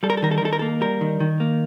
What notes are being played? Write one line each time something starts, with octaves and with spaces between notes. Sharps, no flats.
G3 A4
A#4
A4
D#3 A#4
A4
A#4
D#3 A4
A#4
A#3 A4
G3 A#4
D#3
D#3
A#3